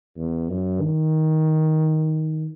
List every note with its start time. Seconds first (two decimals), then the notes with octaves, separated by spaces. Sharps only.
0.17 E2
0.49 F#2
0.81 D#3